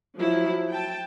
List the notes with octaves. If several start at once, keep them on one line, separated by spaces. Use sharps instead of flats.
F3 F#3 E4
G5 A5